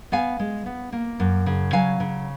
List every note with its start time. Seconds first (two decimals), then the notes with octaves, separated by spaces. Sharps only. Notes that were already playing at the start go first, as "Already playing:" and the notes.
0.12 B3 F5 G#5
0.40 G#3
0.66 B3
0.92 A#3
1.20 F#2
1.46 C#3
1.73 F#3 F5 G#5
2.00 C#3